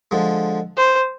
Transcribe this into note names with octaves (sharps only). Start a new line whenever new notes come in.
D3 F3 G#3
C5